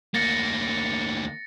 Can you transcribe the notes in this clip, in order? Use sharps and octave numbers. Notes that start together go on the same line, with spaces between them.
D2 A#3 A6 A#6 C#7